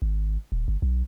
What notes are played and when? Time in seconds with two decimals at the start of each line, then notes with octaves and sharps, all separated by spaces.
0.02 G#1
0.52 D#1
0.68 G1
0.82 B1